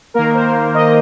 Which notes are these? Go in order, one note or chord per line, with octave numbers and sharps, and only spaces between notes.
D#3 A#3 A#4
C5
D#5